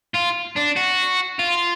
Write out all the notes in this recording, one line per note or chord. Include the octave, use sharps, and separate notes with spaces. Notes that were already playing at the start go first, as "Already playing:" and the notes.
F4
D4
F#4
F4